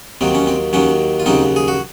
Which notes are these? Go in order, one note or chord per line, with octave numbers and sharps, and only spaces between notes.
D#2 D#3 F#3 C4
C#4
C4
D#2 D#3 F#3 C#4
F4
D#2 C#3 F#3 C4 D#4
G#4
F#4